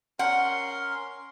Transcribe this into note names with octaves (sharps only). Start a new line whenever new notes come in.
C#4 A#4 F#5 C6